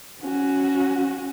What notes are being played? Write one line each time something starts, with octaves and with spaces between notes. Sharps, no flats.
C#4 F#4